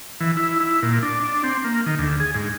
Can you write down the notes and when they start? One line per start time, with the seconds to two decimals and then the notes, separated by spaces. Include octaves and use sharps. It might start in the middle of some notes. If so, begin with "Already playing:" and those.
0.21 E3
0.37 E4
0.60 E4
0.83 A#2
1.03 D4
1.20 D4
1.44 C4
1.64 A#3
1.86 D#3
1.99 D2
2.20 G#4
2.35 G#2